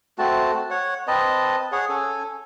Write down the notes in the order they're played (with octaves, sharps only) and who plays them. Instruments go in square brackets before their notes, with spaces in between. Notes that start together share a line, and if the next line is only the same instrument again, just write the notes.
[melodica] A3 C4 F#4 A5
C#5 F#5
C4 B4 D#5 A5
G#4 C#5 F#5
C#4 A4 G#5